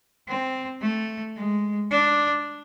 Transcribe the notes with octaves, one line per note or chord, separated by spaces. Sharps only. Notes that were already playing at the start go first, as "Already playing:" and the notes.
C4
A3
G#3
D4